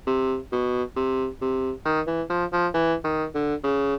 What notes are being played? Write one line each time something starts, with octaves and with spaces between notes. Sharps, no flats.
C3
B2
C3
C3
D#3
E3
F3
F3
E3
D#3
D3
C#3